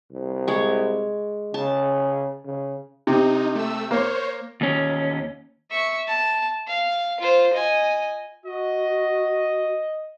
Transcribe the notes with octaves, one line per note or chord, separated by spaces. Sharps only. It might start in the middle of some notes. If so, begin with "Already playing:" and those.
C2
G#3 C#5
C#3 A5
C#3
C3 D#4
A3 E6
A#3 C5 C#5
D#2 C#4
E5 C#6
A5
F5
F4 C5
D#5 G#5
F#4 D#5